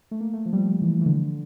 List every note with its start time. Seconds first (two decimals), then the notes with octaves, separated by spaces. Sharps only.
0.11 A3
0.21 A#3
0.33 A3
0.46 F3
0.53 G3
0.57 F3
0.82 E3
1.01 E3
1.06 D3